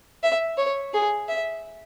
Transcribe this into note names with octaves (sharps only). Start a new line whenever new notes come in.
E5
C#5
G#4
E5